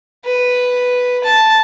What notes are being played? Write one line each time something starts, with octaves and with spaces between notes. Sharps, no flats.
B4
A5